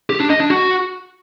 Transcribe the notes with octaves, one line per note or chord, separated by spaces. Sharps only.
G4
D4
D#5
D4
F#4